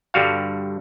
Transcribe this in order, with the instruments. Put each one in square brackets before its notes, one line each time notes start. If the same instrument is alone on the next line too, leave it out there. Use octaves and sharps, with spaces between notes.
[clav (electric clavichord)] G2 D3 G3 F#4 F5